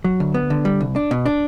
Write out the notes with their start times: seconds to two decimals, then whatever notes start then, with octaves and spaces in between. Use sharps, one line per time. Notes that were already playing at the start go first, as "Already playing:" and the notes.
0.04 F#3
0.20 D2
0.34 B3
0.50 D3
0.65 G3
0.81 C2
0.96 D4
1.11 B2
1.26 D4